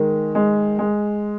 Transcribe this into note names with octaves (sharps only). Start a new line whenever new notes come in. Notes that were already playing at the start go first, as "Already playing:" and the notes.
Already playing: D#3 G#3
G#3
G#3